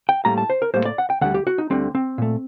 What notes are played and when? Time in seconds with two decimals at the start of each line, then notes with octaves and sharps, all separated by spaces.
0.09 G5
0.25 A2 G3 A#3 A#5
0.38 A5
0.50 C5
0.62 A#4
0.74 A2 G3 A#3 C5
0.85 D5
0.98 F#5
1.10 G5
1.21 D2 D3 G3 F#5
1.34 G4
1.47 F#4
1.58 D#4
1.70 D2 D3 G3 C4
1.95 C4
2.18 A#2 A3